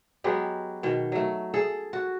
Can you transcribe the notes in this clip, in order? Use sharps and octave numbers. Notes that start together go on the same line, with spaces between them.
F#3 G#3 B3 G4
B2 D#3
F#3 A3
G#4 A4
F#4